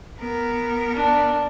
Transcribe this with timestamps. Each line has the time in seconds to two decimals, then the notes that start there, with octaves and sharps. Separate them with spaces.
0.19 B3 A#4
0.94 D4